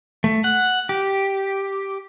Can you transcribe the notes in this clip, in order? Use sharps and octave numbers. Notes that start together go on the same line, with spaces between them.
A3
F#5
G4